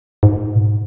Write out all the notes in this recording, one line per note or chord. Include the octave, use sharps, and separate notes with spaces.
G#2
B2